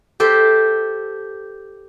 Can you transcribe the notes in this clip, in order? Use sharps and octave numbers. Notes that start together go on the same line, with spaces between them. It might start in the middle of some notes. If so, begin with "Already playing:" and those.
G4 A4 C5 E5